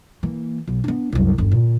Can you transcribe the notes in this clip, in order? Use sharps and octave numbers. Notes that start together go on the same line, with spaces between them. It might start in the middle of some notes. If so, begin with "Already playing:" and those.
E3 A#3
B1
B3 D4
C2 F#2
G1 D#2
A#2 D3